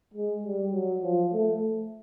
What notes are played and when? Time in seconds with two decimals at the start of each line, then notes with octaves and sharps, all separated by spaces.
0.14 G#3
0.43 G3
0.72 F#3
1.03 F3
1.33 A3